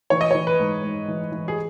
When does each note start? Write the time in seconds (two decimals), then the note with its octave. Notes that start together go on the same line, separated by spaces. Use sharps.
0.10 E3 C#5
0.21 D#5
0.31 E3 C#5
0.47 B4
0.60 G#2
0.84 G#2
1.08 E3
1.32 E3
1.48 G#4